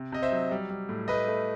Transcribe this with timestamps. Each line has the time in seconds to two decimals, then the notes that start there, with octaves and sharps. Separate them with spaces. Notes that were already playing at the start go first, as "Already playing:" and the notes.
Already playing: C3
0.12 C3 D#5
0.22 C5 E5
0.32 F#3
0.51 G3
0.70 G3
0.89 A2
1.08 A3 B4 D#5
1.28 A3